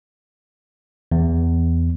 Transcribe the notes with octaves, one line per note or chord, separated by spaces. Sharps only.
E2